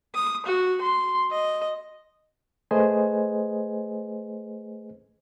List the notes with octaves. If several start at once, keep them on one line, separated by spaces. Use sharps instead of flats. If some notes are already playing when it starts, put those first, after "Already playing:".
D#6
F#4
C6
D#5
A3 G#4 B4 C5 D#5 G#5